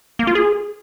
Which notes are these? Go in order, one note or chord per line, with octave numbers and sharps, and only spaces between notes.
A#3
F4
G#4